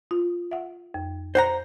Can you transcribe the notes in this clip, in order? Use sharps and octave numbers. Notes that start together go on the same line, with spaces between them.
F4
E5 F#5
F2
C5 F#5 A#5